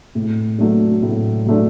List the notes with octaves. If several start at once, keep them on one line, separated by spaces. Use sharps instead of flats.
A2
F#3 A3 D4
A2
F#3 A3 D4